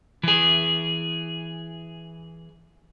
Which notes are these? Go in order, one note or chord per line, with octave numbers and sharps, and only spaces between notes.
E3 G#4